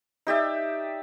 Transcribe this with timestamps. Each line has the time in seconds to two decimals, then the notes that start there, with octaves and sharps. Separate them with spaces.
0.27 D#4 G4 D5 E5